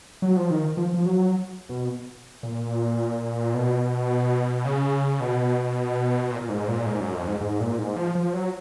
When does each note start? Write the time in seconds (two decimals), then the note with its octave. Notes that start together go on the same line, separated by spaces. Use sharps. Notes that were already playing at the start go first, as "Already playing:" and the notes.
0.22 F#3
0.37 F3
0.50 D#3
0.77 F3
0.94 F3
1.06 F#3
1.69 B2
2.43 A#2
3.54 B2
4.65 C#3
5.20 B2
6.31 A#2
6.41 A#2
6.49 G#2
6.68 A#2
6.86 G#2
7.00 F#2
7.14 F2
7.27 G#2
7.41 G#2
7.60 A#2
7.78 G#2
7.96 F3
8.15 F3
8.33 F#3